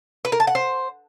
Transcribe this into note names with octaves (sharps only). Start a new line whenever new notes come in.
B4
A#4
A5
F#5
C5